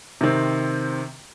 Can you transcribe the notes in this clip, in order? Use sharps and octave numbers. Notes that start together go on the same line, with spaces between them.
C3 D#3 C4